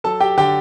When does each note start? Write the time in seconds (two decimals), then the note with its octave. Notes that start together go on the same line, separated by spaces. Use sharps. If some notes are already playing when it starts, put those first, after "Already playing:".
0.04 F#3 A4 A5
0.20 G4 G5
0.37 D3 G4 G5